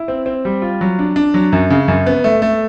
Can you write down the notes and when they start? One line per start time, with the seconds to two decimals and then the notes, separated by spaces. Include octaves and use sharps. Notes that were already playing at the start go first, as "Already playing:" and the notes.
Already playing: E4
0.08 C4
0.26 C4
0.45 G3
0.62 F4
0.81 F#3
0.99 D4
1.16 D4
1.34 F#3
1.53 F#2
1.70 C#3
1.88 F#2
2.06 B3
2.24 A3
2.42 A3